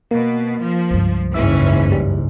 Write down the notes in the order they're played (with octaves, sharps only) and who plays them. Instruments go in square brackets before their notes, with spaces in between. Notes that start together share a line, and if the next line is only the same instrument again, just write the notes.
[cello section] B2 [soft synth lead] A#3
[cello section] F3
[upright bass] C#2 G2
[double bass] F#1 G#2 [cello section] E3 C#4 [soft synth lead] E5
[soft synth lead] G3